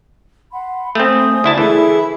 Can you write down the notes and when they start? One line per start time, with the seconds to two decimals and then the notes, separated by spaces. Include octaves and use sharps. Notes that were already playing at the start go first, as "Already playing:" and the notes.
0.51 F#5 B5 C6
0.95 A3 C4 G#5 C6 D#6
1.44 D2 E4 A5
1.58 E3 E4 G#4 A4